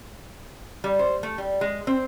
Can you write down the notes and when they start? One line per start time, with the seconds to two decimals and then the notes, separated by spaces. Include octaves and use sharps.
0.84 G3
0.99 C5
1.23 A3
1.38 G3
1.61 G#3
1.87 C4